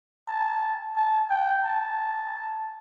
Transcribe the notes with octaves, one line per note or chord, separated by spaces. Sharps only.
A5
A5
G5
A5